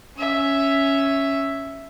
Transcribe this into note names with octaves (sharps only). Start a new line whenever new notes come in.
C#4 E5